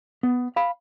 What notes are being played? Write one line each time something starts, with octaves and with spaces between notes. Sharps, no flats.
B3
F5 B5